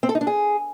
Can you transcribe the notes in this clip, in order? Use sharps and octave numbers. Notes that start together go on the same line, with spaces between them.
C4
A4
D#4
D4
G#4